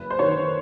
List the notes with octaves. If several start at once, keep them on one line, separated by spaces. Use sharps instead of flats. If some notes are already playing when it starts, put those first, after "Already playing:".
Already playing: F#1 B4
C5
D#3 C#5